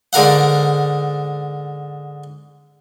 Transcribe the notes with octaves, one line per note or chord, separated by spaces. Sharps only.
G#2 D3 A#4 F5 F#5